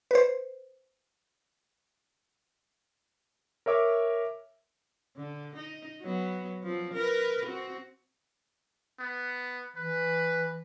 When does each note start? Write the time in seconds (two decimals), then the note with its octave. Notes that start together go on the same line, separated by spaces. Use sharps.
0.11 B4 C5
3.66 A#4 C#5 E5 D6
5.16 D3
5.56 D#4
6.02 F#3 B3
6.63 F3 C4
6.94 A#4 B4
7.46 C4 F#4
9.00 B3
9.76 E3 B4